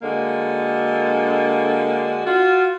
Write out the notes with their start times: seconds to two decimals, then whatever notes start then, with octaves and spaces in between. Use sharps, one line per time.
0.03 D3 G#3 A#3 F#4
2.26 F4 F#4